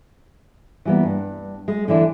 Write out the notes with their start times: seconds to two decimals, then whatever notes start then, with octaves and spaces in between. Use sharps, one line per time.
0.85 E3 G3 A#3 B3
1.03 G2
1.68 G#3
1.88 D3 E3 D4 E4